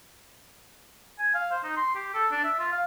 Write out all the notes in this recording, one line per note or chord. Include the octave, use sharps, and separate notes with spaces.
G#5
F5
C5
D#4
C6
G4
A4
D4
E5
F4
F5